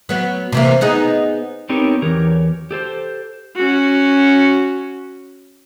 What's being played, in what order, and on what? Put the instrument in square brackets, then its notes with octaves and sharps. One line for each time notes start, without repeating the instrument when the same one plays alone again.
[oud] F#3 B3
C3 E3 A#3
B3 D#4 G#4
[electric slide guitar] B3 C4 D#4 G4 A#4 C#5
E2 E3 G4 A#4 C#5
G4 A4 C5
[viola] C#4 F#4